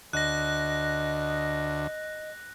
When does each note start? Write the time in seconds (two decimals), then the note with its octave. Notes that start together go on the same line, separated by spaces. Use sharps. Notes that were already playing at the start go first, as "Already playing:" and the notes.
0.13 D2 D#5 F#6 A#6